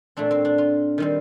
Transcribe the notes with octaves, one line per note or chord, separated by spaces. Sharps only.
A#2 A3 C4 D4
C4
D4
F4
D#3 G3 C4